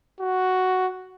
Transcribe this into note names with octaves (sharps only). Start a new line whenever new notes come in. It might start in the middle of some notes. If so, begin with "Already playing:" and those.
F#4